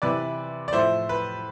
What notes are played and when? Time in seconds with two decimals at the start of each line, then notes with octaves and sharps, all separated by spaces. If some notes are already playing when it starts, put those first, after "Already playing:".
0.02 C3 E3 B4 D5
0.68 D5
0.73 A2 F3 C5 E5
1.09 B4